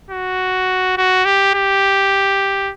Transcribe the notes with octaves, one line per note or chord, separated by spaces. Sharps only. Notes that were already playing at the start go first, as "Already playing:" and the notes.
F#4
F#4
G4
G4